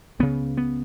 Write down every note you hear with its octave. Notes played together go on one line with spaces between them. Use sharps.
C#2 C#3 B3
B3